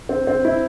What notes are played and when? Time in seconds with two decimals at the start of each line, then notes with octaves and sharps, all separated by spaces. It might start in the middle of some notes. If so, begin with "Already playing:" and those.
0.09 C4
0.27 C4
0.45 E4